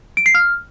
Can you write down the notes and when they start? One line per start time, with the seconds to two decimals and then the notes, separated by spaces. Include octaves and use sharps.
0.17 D7
0.26 C7
0.35 F6